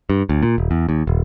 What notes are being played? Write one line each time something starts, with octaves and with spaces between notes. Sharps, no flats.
G2
D2
A#2
D#1
E2
D#2
D#1